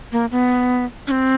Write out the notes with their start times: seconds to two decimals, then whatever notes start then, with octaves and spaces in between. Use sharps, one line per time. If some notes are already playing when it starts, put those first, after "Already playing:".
0.12 A#3
0.32 B3
1.07 C#4
1.11 C4